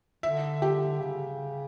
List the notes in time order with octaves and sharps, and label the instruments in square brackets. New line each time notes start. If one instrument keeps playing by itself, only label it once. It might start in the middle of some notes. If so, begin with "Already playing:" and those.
[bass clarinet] D3 [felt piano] E5
[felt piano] G4
[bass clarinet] C#3